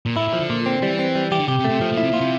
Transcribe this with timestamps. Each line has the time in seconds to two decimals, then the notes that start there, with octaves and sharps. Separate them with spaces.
0.06 A#2
0.16 A2 E4
0.28 A#2
0.33 F3
0.39 D3
0.50 A#2
0.66 C4
0.82 E3 G3
0.99 C4
1.15 G3
1.31 E3 G4
1.40 D3
1.48 C3 G4
1.60 C3
1.64 A3
1.70 C3
1.81 A2 F3
1.93 A#2
1.97 E4
2.03 C3
2.12 A#2 F4
2.21 C3